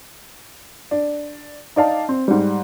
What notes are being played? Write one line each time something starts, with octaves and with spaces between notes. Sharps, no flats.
D4
D#4 D5 F5 A5
C4
G#2 G3